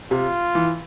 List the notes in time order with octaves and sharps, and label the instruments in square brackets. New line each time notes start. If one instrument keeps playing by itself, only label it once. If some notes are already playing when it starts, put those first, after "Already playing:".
[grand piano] C3 [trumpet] F4
[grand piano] E3